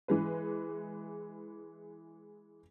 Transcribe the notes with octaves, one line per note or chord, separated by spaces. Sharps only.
E3 G#3 B4